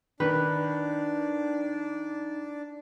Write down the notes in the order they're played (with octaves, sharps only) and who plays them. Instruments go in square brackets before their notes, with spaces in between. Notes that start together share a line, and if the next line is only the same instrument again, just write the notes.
[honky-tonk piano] D#3 [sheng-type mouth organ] D4 [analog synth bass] D#4 [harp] B4